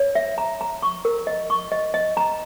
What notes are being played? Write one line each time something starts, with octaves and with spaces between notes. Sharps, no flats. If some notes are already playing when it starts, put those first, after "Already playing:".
Already playing: C#5
E5
A#5
A#5
C#6
A#4
D#5
C#6
D#5
D#5
A#5